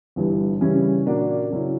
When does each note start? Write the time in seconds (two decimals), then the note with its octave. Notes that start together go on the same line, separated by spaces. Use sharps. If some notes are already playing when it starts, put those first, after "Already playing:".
0.16 G1 G2 E3
0.61 C#3 E3 G3 C#4 E4
1.06 A#2 A#3 D4 F#4
1.50 C#3 F#3 C#4 E4